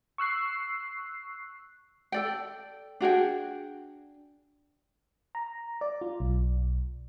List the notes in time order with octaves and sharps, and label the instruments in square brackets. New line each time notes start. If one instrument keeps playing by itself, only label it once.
[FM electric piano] C#6 E6 F#6 C7
[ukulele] A4 D5 G5
D4 F#4 G#4 G5
[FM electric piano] A#5
D5
F4
B1